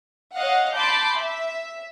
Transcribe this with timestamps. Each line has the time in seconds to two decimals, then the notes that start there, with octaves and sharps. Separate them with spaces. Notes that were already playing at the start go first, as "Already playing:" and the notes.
0.35 C#5 D#5 F5 F#5
0.76 A5 B5 C6 D6 G6
1.17 E5